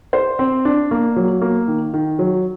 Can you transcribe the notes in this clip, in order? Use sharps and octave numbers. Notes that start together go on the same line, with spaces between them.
C5
C4
D4
A#3
F#3
A#3
D#3
D#3
F#3